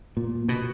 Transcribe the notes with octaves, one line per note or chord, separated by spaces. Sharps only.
A#2
B2